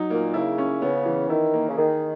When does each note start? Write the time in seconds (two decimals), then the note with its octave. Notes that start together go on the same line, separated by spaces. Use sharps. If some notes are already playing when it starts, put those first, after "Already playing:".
Already playing: F#3 D#4
0.10 A#2 A#3
0.34 C#3 E4
0.58 C#4
0.82 C#3 B3
1.05 E3
1.29 D#3 E4
1.54 A#3
1.68 C#3
1.77 D#3 G#4